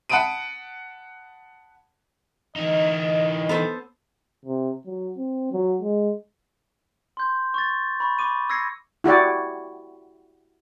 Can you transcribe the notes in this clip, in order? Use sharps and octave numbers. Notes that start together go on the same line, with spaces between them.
F#5 A5 B5 D#6 D7 D#7
E3 D#4 D#5
B3 A4 C5
C3
F#3
C4
F#3
G#3
C6 G6
C#6 A6
B5 C#6
B5 C#6 D6 D#7
E6 G#6 A#6 C7 C#7
E4 F#4 G4 D5